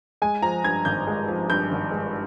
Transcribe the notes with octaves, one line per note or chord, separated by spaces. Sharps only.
G#3 G#5
F3 A#5
G2 G#6
G#1 G6
G#3
F3
G2 G6
G#1
G#3